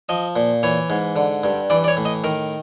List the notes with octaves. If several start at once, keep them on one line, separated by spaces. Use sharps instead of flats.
F3 D#5
A#2
E3 C#5
G#2
D3
G2
E3 D5
D5
C#5
A2
D#5
D#3 A#4